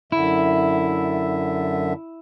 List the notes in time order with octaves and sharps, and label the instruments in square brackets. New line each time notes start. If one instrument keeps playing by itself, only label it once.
[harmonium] F#2 D3 E5 [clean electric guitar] E4